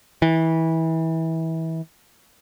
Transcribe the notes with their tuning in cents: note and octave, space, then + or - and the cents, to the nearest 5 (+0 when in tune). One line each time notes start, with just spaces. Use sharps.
E3 -25